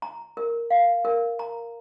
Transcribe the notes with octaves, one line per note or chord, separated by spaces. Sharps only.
A#5
A#4
F5
A#4
A#5